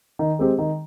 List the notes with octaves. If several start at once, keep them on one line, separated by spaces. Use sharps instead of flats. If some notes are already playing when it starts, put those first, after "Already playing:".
D#3
G#3 C4 G4
D#3